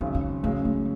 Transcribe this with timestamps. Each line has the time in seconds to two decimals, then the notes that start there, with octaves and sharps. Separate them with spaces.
0.01 G#1 F#2 C#3 B3
0.15 C#4
0.43 F#2 C#3 G#3 A3 C#4
0.65 A3